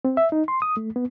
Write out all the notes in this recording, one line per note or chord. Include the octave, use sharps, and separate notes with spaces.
C4
E5
D#4
C6
D#6
A3
B3